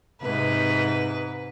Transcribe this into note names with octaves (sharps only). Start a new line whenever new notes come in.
G#2 C3 B4